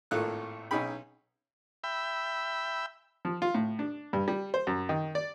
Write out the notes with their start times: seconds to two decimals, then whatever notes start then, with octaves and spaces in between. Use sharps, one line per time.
0.11 G#1 A2 A#3 F4 A4 F#6
0.71 B1 C#4 D#4 G#4 G5 B5
1.84 E5 G5 B5
3.25 F3
3.42 F4
3.55 A2
3.79 D4
4.13 G2
4.28 G3
4.54 C5
4.67 F#2
4.89 D#3
5.15 D5